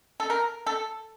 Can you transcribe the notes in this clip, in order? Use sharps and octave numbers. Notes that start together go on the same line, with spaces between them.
A4
A#4
A4